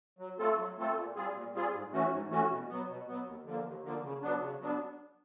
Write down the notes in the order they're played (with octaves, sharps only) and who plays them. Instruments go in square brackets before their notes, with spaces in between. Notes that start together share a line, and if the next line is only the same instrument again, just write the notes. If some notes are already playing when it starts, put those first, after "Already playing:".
[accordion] F#3
A3 C4 F4 A4
F#3
A3 C4 F4 A4
A#2
G3 C4 F4 G#4
A#2
G3 C4 F4 G#4
G#2
E3 A3 C#4 F#4
G#2
E3 A3 C#4 F#4
B2
F#3 B3
B2
F#3 B3
D#2
D3 F3 A#3
D#2
D3 F3 A#3
C#3
F#3 B3 D4
C#3
F#3 B3 D4